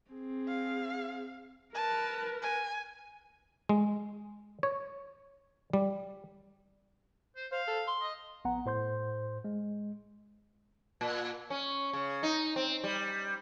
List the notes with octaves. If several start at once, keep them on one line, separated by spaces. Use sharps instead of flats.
C4 G#4
F5
A#4 B4 A5
G#5
G#3
C#5
G3
C5
C5 F5
A4
C6
D#5
A#1 B3 F#5 A#5
A2 C5 C6 G6
G#3
A#2
C#4
C#3
D#4
C4
G3